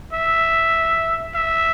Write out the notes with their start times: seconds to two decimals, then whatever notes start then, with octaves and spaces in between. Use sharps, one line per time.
0.13 E5
1.34 E5